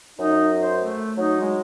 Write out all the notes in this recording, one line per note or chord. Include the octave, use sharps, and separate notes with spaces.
F#2 D#4
C5
A3
F#3 D#4
G#3